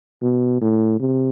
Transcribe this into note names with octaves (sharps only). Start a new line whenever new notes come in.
B2
A2
C3